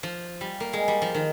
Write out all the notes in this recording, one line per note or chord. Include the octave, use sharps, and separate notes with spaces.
F3
G3
A#3
G#3
G3
F3
D#3